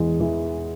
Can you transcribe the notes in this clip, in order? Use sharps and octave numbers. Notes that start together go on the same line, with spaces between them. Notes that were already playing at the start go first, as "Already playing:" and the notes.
Already playing: E2 G#3
E3